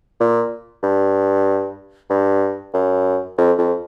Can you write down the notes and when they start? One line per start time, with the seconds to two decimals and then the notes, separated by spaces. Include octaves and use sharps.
0.20 A#2
0.83 G2
2.10 G2
2.74 F#2
3.38 F2
3.58 F2